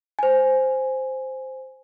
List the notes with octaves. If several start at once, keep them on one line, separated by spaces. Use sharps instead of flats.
C5 G#5